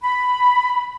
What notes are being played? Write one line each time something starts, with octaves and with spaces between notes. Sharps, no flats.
B5